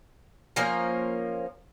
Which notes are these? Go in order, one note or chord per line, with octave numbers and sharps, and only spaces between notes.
F3 A#3 C#4 A#4